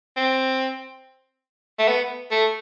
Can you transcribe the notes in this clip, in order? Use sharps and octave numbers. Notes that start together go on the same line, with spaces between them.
C4
A3
B3
A3